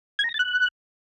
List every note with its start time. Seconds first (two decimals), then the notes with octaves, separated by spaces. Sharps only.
0.19 G#6
0.24 A#5
0.29 A#6
0.34 A6
0.39 F#6